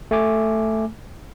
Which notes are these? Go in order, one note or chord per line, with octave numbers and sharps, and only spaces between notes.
A3 G#5 D6